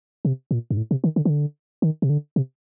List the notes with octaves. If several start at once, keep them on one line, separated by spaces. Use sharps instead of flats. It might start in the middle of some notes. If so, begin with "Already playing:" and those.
C3
A#2
G2
A2
C3
D#3
D3
D#3
D3
D#3
C3
D3
C3